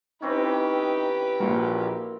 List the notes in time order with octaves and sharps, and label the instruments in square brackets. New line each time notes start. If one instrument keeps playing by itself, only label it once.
[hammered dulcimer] E3 C4 C#4 [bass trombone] D#4 [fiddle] G4 B4
[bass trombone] A#1 [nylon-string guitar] A#3 F#4 [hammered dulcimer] A#4 C6